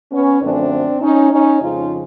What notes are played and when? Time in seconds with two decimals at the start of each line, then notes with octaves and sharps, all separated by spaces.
0.12 B3 C#4
0.41 F#2 D3 F3 A3 C4 D4
1.01 C#4 D#4
1.31 C#4 D#4
1.61 F2 C#3 F3 G#3 D#4 F4